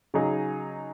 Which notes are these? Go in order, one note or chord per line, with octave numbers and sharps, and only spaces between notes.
C#3 F#3 D#4 G#4